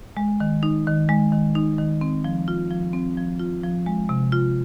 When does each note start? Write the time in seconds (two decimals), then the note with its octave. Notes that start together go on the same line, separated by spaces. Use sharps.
0.17 G#3
0.40 D#3
0.63 D#4
0.87 D#3
1.09 G#3
1.32 D#3
1.55 D#4
1.78 D#3
2.01 C4
2.24 F3
2.48 F4
2.71 F3
2.93 C4
3.17 F3
3.39 F4
3.64 F3
3.86 G#3
4.09 C3
4.32 F4